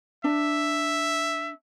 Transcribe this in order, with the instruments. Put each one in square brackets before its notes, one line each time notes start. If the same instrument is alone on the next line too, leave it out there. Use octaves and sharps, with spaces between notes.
[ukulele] D4 [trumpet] E5